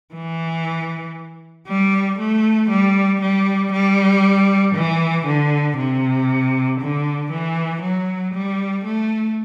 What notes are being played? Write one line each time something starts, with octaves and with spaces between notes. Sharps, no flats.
E3
G3
A3
G3
G3
G3
E3
D3
C3
D3
E3
F#3
G3
A3